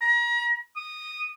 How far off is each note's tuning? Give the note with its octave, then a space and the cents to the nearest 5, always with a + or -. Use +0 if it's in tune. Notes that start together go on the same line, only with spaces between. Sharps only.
A#5 +40
D#6 -15